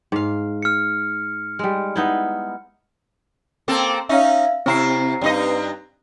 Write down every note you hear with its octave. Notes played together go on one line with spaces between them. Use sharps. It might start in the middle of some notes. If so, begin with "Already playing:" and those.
G#2 F5
F6 C#7
G3 G#3
B3 D#4 E4
A#3 C4 A4
C#4 D#4 E5 F5
C3 C4 E4 A#5 C7
G2 D#4 D#5